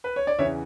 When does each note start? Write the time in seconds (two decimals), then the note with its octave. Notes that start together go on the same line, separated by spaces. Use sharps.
0.04 B4
0.16 C#5
0.27 D5
0.39 E2 C#3 E3 C#5 E5